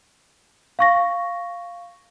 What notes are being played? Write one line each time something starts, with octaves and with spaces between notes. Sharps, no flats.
F5 C#6 A#6